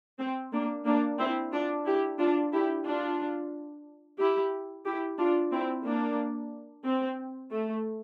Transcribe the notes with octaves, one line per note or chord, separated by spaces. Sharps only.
C4
A#3 D4
A#3 D4
C4 E4
D4 F4
E4 G4
D4 F4
E4 G4
D4 F4
E4 G4
E4 G4
D4 F4
C4 E4
A#3 D4
C4
A3